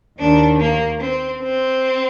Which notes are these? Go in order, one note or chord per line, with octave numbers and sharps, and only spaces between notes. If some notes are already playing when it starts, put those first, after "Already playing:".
D#2 D#3 D4
A#3
C4
C4